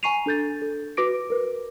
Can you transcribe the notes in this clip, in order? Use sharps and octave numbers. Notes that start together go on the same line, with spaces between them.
G#5 A#5 C#6 C7 D#7 F7
D4 A4 G6 A6
A4
F#4 B4 D6 A#6 D7
A#4 B4